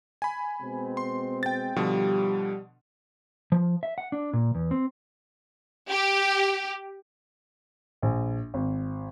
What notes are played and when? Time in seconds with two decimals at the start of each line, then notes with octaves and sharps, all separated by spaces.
0.22 G#5 B5
0.62 B2 G#3 C4
0.97 C6
1.43 G5 A6
1.76 B2 D3 F3 G3
3.52 F3
3.83 E5
3.98 F#5
4.12 D4
4.33 A#2
4.55 E2
4.71 C4
5.90 G4
8.02 A#1
8.54 G#1